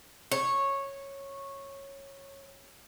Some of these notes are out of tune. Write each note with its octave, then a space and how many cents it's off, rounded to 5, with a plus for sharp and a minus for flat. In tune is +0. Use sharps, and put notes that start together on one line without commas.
C#5 -10